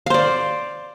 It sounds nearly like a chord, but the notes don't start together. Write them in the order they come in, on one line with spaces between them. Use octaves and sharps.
F5 C5 D5